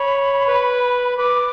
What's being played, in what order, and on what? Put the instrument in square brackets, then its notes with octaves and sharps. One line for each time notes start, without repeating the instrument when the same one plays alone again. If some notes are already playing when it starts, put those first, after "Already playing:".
Already playing: [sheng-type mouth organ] C#5 [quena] B5
[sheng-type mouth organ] B4
[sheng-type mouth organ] B4 [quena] D6